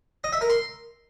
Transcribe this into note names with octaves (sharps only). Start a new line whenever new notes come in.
D#5
E5
A#4
C6